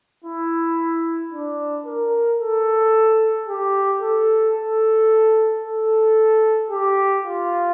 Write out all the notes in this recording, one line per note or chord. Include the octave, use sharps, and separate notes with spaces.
E4
D4
A#4
A4
G4
A4
A4
A4
G4
F4